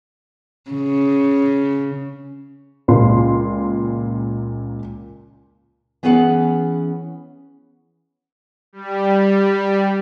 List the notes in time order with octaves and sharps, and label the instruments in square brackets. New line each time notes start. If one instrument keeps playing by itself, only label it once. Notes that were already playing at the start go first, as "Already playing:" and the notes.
[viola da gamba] C#3
[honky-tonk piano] C#2 A#2 C6
[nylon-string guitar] E3 B3 C#4 G#4 B4 F#5
[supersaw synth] G3